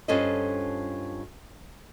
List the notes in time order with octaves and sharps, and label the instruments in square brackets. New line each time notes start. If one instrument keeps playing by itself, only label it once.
[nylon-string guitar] G2 C#4 F4 A4 C5 D#5